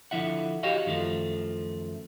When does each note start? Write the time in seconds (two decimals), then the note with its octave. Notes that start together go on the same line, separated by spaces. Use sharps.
0.11 D3 F3 E4 E5 F#5
0.63 F#4 G4 C#5 D#5 F5
0.86 F#2 D#3 F3 A3